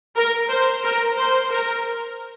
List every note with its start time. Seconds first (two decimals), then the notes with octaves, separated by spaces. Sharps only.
0.17 A#4
0.50 C5
0.84 A#4
1.17 C5
1.50 A#4